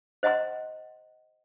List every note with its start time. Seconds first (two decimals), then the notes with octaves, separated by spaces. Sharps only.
0.23 C5 D#5 F#5 A#5 C6